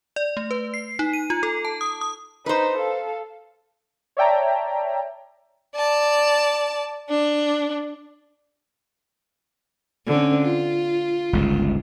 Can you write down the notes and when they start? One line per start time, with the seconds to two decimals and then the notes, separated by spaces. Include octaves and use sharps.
0.16 D5
0.37 A3
0.51 B4
0.74 C7
0.99 D#4
1.13 D#7
1.30 F4
1.43 A4
1.65 A5
1.81 D#6
2.01 D#6
2.46 D#4 B4 C5
2.77 A4 F5
4.17 C#5 D5 E5 G5 A5 A#5
5.76 D5 A5
7.09 D4
10.07 D3 C4 C#4
10.41 F4
11.33 G1 C#2 G#2